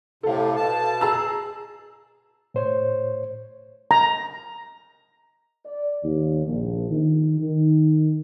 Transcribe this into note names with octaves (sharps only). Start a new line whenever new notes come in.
A2 C3 A4 F5
B2 A5
G#4 A#5 E6
A2 C5 C#5
A#5
D5
D#2
A#1
D#3
D#3